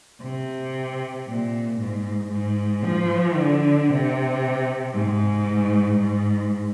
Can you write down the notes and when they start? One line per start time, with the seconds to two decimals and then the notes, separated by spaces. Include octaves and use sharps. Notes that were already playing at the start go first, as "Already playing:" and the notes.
0.22 C3
1.27 A#2
1.80 G#2
2.32 G#2
2.85 F3
3.37 D3
3.90 C3
4.94 G#2
6.00 G#2